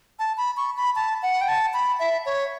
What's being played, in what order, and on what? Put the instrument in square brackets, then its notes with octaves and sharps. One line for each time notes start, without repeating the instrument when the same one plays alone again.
[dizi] A5
B5
C#6
B5
A5
F#5
G5
A5
B5
E5
C#5